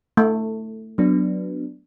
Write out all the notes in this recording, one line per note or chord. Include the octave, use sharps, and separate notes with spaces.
A3
F#3 B3 D4